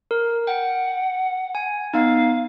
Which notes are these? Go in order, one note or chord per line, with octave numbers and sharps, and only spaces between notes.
A#4
F#5 G5
G#5
B3 D#4 F5